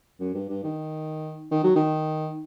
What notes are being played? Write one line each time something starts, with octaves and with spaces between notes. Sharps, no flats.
F#2
G2
G2
D#3
D#3
F#3
D#3